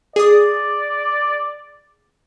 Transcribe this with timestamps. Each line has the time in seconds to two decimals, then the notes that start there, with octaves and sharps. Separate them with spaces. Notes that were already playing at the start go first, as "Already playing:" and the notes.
0.16 G#4 D5 D#6